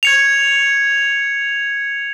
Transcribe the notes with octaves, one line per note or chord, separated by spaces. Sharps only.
G#6 C#7 F7